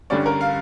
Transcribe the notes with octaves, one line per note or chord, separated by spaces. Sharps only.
G2 D3 G3 C#4 D5
A#4
F5